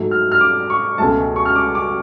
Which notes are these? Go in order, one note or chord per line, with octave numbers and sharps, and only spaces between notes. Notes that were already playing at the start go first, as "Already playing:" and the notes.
Already playing: G#2 F#3 A3
F6
F6
D6
C#6
C#2 B2 F#3 A3 A5
C#6
F6
D6
D6